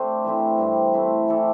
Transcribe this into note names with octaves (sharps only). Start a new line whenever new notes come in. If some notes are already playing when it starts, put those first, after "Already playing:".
Already playing: A3 C4 D4 G4 C5
E3 A3 C4 E4
G2 G3 C4
A3 C4 E4
E3 C4 A4 D5